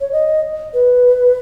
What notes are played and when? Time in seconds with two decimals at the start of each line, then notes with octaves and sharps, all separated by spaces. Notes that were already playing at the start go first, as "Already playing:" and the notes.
0.01 C#5
0.12 D#5
0.74 B4